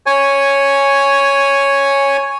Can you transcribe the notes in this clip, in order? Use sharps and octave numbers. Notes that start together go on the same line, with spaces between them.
C#5 G#5